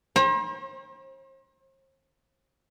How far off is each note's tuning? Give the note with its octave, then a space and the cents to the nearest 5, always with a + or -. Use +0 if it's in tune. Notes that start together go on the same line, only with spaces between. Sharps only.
C5 +40 A#5 +45